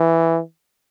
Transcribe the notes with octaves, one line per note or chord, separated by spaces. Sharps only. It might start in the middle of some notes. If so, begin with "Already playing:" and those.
Already playing: E3